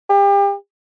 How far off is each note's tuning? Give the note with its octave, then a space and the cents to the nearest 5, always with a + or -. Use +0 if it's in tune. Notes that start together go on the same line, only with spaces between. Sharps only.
G4 +35